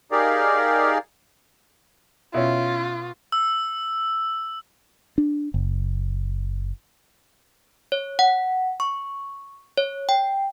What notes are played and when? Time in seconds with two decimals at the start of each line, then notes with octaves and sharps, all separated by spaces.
0.12 D#4 G4 G#4 A#4 D5 F5
2.34 B2 C#4 E4 F4
3.32 E6
5.18 D4
5.54 F#1
7.92 C#5
8.19 F#5
8.80 C#6
9.78 C#5
10.09 G5